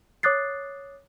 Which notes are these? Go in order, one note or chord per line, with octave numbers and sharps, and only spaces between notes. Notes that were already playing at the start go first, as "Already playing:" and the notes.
C#5 D6 D#6 F#6 A6 C7